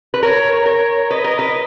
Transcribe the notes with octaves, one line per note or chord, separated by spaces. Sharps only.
B4
A#4 C#5
A#4 C#5
B4 D#5
A#4
B4